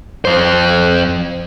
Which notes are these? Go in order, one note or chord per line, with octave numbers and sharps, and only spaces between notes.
F2 C5